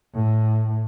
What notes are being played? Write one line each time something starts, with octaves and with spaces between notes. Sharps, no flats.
A2